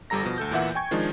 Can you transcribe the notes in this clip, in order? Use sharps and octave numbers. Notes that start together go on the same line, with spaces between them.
G1 G3 A4 A#5 A#6
B2 F3
D2 A4 G6
E2 A#2 E3 E5 F#5
G5 G#5 C#6 G#6
D#3 F3 G#3 D4 D#4